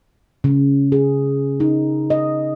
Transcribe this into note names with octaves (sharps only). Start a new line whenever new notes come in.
C#3
G#4
D#4
D#5